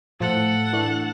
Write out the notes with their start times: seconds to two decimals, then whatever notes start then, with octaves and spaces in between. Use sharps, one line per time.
0.20 A2 F3 A4 F#5
0.73 E3 A3 D4